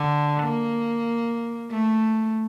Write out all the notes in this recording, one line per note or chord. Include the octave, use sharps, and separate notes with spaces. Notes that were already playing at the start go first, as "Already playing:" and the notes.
Already playing: D3
A#3
A3